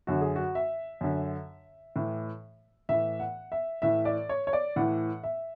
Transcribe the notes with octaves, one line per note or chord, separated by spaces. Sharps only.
F#2 D3 F#4
G#4
F#4
E5
F#2 D3
A2 E3
A2 E3 E5
F#5
E5
A2 E3 E5
D5
C#5
C#5
D5
A2 E3 F#5
E5